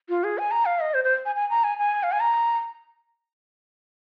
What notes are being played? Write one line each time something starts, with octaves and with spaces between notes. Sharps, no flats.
F4
G#4
G#5
A#5
F5
D#5
C5
C5
G#5
G#5
A#5
G#5
G#5
F5
G#5
A#5